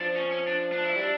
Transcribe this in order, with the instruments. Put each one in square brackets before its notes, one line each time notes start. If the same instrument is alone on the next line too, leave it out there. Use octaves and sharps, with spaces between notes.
[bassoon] F3 [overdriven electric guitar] D4
[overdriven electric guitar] C#4
C#4
D4
D4
E4
[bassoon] G3 [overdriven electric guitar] D4